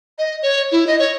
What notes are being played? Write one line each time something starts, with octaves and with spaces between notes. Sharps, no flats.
D#5
C#5
E4
D#5
C#5